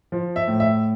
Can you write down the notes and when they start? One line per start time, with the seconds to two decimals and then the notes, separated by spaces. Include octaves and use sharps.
0.12 F3
0.36 E5
0.48 A2
0.60 E5